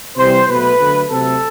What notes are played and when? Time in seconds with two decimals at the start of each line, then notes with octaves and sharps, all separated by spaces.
0.17 C3 E3 G3 C5
0.48 B2 F#3 A3 B4
0.79 D3 F#3 A3
1.10 C3 F#3 A3 A4